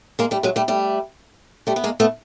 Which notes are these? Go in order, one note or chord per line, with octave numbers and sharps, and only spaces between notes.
G#3 A#3
G3 A3
F#3 G#3
G3 A3
G3 A3
G3 A3
B3
G#3 A#3
A3 B3